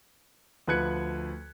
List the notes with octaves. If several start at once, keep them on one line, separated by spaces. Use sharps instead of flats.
D2 F3 B4 F#6 G#6 C#7